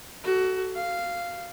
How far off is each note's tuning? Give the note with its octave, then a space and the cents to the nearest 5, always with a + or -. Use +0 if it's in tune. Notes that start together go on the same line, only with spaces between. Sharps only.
F#4 +20 A4 +0
F#4 -5 F5 -10